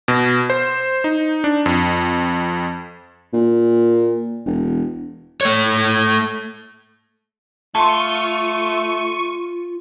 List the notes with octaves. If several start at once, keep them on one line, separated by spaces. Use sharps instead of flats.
B2
C5
D#4
D4
F2
A#2
E1
A3 C#5
A3 F4 A5 C6 C#6 D#7